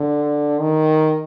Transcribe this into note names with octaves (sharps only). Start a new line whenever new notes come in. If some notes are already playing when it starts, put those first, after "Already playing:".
Already playing: D3
D#3